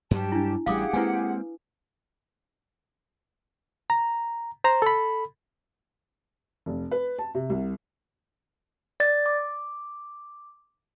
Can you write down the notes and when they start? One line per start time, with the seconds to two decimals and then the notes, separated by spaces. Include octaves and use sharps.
0.11 G2 F#3 G3 G4 A5
0.32 D4 E4
0.66 A1 G3 G4 G#4 F5 F#5 D6 D#6
0.93 G#3 A#3 C4 E4 B4 G#5
3.90 A#5
4.64 C5 A#5
4.82 A4 B5
6.66 F1
6.91 B4
7.19 A5
7.35 C3
7.50 C2
9.00 D5 A6
9.26 D6